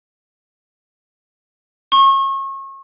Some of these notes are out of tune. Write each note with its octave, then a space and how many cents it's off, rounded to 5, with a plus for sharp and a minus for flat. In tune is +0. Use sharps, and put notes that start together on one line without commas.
C#6 -35